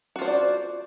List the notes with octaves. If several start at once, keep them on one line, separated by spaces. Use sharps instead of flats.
D4 F4 F#4 C5 D5